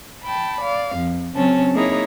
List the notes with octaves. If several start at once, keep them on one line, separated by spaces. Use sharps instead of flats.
G5 A5 B5
D5 F5
F2
C#3 F#3 C4 C#4 A5
A#3 D#4 E4 G#4 C#5 A#5